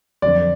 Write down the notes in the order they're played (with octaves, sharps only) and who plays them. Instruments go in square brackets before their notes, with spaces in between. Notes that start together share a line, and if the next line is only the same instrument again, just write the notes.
[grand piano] F2 D3 F#3 D5